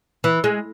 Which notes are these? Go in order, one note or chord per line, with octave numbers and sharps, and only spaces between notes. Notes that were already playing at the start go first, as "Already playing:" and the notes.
E3
G#3